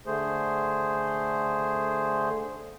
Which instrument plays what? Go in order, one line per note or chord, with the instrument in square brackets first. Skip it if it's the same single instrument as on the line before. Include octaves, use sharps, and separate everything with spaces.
[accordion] D3 A3 G#4 C5